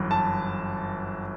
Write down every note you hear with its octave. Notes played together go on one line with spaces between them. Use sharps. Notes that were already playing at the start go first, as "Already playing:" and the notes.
Already playing: G1 F#2 E3
A5